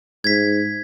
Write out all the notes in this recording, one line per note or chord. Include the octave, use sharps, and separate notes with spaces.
G#2 G#6 B6